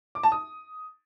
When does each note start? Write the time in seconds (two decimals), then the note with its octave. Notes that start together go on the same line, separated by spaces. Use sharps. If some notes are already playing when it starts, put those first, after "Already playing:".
0.15 D6
0.23 A5
0.32 D#6